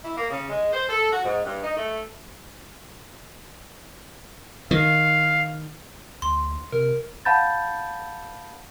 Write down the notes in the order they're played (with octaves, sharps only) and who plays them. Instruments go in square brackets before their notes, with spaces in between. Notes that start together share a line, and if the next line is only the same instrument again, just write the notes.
[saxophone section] E4
A#3
C#3
G#3
C5
A4
F#4
G#2
G2
D#4
A3
[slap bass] D#3 [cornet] F5
[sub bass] D2 [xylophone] C6
[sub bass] C3 [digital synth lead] A#4
[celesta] F5 F#5 A5 B5 G6 A6